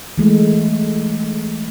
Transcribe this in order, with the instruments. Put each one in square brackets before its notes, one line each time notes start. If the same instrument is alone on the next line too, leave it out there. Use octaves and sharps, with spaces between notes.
[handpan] E3 G#3 A3